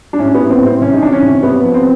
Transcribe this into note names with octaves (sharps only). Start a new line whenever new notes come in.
D4
A2 C#4
B3
A2
C4
A2
C4
C3 C#4
D#4
E3 D4
C#4
C3
C3 B3
F3
C4